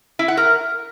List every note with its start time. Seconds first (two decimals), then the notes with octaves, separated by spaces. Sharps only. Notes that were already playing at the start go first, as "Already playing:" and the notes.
0.19 E4
0.28 F#5
0.37 A#4